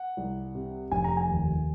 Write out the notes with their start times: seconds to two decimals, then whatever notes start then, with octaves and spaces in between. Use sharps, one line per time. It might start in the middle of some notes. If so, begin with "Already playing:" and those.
Already playing: F#5
0.17 C2
0.55 C3
0.92 F1 G#5
1.04 A#5
1.17 G#5
1.29 D#2